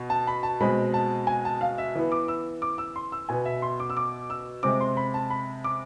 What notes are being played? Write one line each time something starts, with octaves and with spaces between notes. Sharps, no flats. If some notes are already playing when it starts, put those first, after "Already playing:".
Already playing: B2
A5
B5
A5
B2 G#3 C4 B5
A5
G#5
A5
F5
E5
E3 B3
D6
E6
D6
E6
C6
E6
B2 B3 G#5
E5
C6
D6
E6
D6
E6
C3 G#3 C4 D6
C6
B5
A5
B5
D6